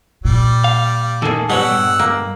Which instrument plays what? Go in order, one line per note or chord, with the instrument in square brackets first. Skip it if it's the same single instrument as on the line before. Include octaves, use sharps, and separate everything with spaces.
[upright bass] A#2 [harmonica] G3
[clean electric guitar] F5
[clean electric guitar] D#2 D#3 A#3 [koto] G#4 A4
[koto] B2 C#5 [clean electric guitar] G3 [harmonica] F#5 E6
[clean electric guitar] G2
[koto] A#3